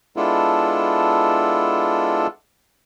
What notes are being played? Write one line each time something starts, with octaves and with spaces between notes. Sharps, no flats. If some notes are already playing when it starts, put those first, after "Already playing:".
G#3 B3 D4 E4 F4 A4